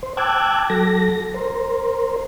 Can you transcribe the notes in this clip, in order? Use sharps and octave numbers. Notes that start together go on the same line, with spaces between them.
C5
G5 A5 D6 E6 F#6 G#6
F#3 A4 A#6
A#4 C5